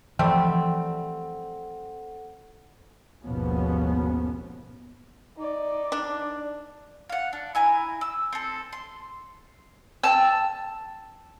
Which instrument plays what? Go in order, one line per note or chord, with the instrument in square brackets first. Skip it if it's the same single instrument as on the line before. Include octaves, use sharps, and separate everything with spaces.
[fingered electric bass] E3 F3 [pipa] G3 A3 C4 [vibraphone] A4 F#5
[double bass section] G#1 D#2 B2 F3 B3 C#4
[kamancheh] D#4 D5
[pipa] D4
[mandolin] F5 F#5
D4
E4 G#5 A#5
E6
C4 A4
C6
A5 E6